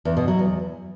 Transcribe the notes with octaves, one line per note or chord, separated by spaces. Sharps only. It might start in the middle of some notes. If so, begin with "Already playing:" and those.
E2
B2
F#3
E2